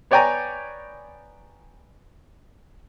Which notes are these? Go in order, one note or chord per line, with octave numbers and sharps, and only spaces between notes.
B3 C#5 D5 G5 G#5 A#5